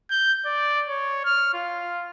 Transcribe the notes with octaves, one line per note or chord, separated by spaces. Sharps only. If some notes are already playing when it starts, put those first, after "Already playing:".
G6
D5
C#5
F6
F4